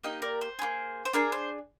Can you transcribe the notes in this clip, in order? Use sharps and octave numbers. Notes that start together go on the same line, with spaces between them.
A#3 D#4 G4 D#5 G5
A#4 D5
C5
A#3 F4 G#4
C5
D4 G#4 A#4
C5